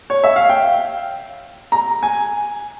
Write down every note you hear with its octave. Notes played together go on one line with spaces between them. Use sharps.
C#5
E5
F5
G5
A#5
G#5